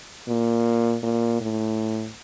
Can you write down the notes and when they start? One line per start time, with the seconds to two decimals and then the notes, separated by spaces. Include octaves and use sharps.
0.29 A#2
1.03 A#2
1.41 A2